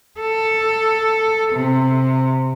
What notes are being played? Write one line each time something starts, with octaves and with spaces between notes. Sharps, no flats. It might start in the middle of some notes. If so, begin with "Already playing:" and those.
A4
C3